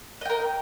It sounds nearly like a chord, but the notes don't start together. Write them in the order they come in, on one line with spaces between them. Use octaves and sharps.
D#5 G5 A#4